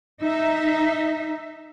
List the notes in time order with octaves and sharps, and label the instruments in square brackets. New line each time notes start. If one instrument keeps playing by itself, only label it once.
[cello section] D#4 E5